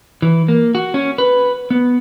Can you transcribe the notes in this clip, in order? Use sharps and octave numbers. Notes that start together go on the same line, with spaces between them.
E3
A#3
F#4
C#4
B4
B3